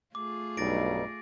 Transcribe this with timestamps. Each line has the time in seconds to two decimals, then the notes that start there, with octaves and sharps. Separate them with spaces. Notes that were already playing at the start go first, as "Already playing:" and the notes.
0.15 A3 F4 G#4 D6
0.57 B1 G2 G3 D#4 A6 A#6 D7